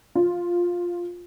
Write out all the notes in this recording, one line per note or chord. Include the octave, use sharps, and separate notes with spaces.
F4